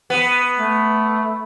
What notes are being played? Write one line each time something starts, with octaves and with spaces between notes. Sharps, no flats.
B3
A3